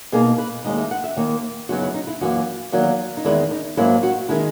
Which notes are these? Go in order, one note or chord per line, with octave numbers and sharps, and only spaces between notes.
B2 A#3 D#4 G#4
B4
D#2 C#3 G#3 D#4 D#5
E5
F#5
E5
D#2 D#3 A#3 C#5
F#2 C#3 F#3 B3 D#4 F#4
E4
D#4
E4
F#2 E3 A#3 F#4
E2 D#3 F#3 A#3 F#4
D#4
E2 D#3 G#3 E4
D#4
G#2 F#3 A#3 C#4 E4
F#4
D#3 G#3 E4